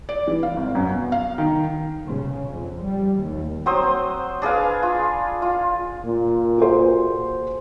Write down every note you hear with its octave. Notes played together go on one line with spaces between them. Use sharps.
D5
E3
F5
G#1
F#2
B2
F5
D#3
C#3
F2
G3
D#2
F#3 C4 C5 D#6
D4 G#4 B4 F5
F4
F4
A#2
F#4 G#4 C5